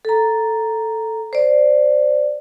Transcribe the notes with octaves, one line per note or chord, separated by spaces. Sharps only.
A4 A#5
C5 D5